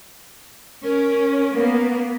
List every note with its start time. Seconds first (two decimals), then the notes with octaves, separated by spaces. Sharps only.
0.84 C#4 A#4
1.56 A#3 B3